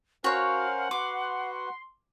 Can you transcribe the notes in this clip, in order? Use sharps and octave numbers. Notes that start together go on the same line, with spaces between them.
C#4 F#4 A#4 C5 C#5 F5 F#5
F#4 B4 C6 D6